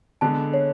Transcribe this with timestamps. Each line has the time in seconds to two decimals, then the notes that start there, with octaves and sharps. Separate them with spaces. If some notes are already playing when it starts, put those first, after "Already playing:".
0.21 D3 G#3 B3 D4 A5
0.54 C#5